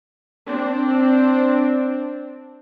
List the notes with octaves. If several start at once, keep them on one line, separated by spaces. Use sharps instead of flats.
C4 D4